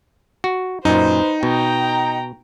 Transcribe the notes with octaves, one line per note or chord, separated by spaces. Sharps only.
F#4
F#2 A#2 D#4 B4 C5
B2 G5 A#5